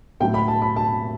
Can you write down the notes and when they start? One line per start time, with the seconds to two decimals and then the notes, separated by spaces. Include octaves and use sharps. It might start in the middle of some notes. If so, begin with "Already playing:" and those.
0.20 A2 F#3 G5
0.34 B5
0.48 A5
0.62 B5
0.76 A5